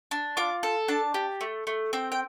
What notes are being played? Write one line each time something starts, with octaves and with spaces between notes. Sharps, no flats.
D4
F4 D6
A4
D4 A5
G4
A3
A3
C4 G5
G5